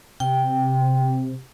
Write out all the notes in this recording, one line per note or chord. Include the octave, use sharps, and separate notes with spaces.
C3 G5